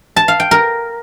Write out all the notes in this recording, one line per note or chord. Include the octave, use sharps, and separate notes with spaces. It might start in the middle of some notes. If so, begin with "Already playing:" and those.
A5
F5
G5
A#4